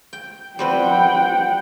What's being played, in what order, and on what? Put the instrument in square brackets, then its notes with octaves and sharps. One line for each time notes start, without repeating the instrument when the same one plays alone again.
[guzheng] G5
[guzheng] G3 C4 B4 [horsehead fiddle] F#5 G5